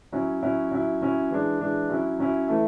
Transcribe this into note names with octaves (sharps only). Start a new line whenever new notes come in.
F#3 C#4 E4
F#3 C#4 E4
F#3 C#4 E4
F#3 C#4 E4
E3 G#3 D4
E3 G#3 D4
F#3 C#4 E4
F#3 C#4 E4
E3 A3 E4